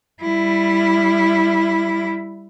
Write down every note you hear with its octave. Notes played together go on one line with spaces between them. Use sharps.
G3 E4